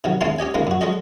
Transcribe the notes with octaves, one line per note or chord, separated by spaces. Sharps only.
C3 D#3 F#3
D#2 G#3 C#4 E4 A5 C6
C#4 G4 D#5 G#5
C#2 C3 D#3 G#3 A#3
F#2 F#4
F#3 G#3 F#4 A4 D#5